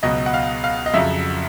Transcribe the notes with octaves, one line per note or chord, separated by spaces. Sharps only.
C#2 B2 F#3 D#5
F#5
F5
F5
D#5
F2 C#3 F#3 E5